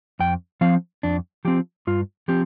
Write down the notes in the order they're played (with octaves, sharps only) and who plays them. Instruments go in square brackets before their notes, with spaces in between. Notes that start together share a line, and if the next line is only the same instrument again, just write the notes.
[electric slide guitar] F2 G5
F3 C4 F5
F2 D4
F3 C4 G4
G2 F4
F3 C4 G4